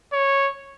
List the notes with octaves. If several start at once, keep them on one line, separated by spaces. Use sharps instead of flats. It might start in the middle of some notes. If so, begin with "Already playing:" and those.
C#5